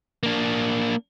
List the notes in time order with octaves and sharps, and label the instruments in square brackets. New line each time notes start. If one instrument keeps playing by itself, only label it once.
[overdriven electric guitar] A#3 D4